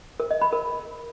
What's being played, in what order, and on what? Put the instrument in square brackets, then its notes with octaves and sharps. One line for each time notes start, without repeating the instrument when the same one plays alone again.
[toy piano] A#4
D#5
B5
A#4